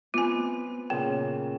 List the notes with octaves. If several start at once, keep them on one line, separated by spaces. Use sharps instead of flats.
B3 C4 F4 G#5
A#2 C#3 A#3